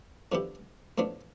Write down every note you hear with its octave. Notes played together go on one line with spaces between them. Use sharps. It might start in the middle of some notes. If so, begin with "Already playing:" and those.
D3 F3 B3 E4 G4
A2 F3 B3 D4